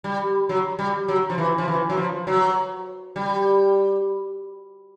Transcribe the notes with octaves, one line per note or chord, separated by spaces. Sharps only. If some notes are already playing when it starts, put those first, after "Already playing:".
G3
F#3
G3
F#3
F3
E3
F3
E3
F#3
F3
F#3
G3